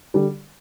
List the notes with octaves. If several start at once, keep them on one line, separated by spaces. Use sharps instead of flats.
D3 G3